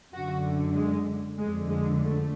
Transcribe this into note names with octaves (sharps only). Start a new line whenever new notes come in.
F#2 D3 F#4
G#3
F2 D3 G#3
G#3
A3